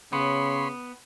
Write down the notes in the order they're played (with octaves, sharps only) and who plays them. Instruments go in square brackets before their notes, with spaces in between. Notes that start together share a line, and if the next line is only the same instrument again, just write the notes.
[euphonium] C#3 [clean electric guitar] B3 [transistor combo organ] C#5 B5 C6